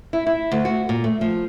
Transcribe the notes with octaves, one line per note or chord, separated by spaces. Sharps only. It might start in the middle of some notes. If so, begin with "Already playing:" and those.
E4
E4
D2
F#4
A#2
A3
F3